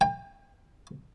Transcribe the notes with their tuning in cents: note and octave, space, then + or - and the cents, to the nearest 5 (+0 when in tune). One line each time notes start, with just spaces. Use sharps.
G5 +35